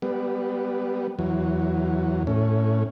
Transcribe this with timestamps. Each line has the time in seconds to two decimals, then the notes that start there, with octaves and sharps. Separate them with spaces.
0.02 G3 B3
1.19 E2 F#3
2.27 A2 C#4